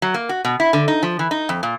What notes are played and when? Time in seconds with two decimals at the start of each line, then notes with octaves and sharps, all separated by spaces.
0.02 F#3
0.14 A#3
0.29 F#4
0.45 B2
0.60 E4
0.73 D3
0.88 D#4
1.03 F3
1.19 E3
1.31 D#4
1.49 F2
1.63 A#2